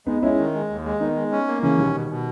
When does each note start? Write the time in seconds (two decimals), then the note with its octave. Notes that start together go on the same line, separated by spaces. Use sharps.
0.06 G#3 B3 D#4
0.22 G#3 C#4 E4
0.39 D#3
0.54 G#3
0.70 D#2
0.85 G#3
1.00 D#3 B3 D#4
1.16 G#3
1.32 C#4
1.47 A#3
1.63 C#3 E3 C#4
1.78 B2 D#3 G3
1.94 B2
2.10 B2